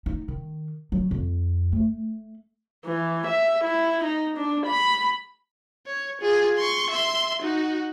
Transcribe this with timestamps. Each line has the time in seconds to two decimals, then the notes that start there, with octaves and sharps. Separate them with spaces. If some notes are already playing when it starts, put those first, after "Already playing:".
0.06 D#4
0.28 D#3
0.92 F#3
1.11 F2
1.72 A3
2.85 E3
3.26 E5
3.64 E4
4.03 D#4
4.37 D4
4.67 B5
5.87 C#5
6.21 F4 G#4
6.57 C6 C#6
6.90 E5 C6
7.42 D#4 F#4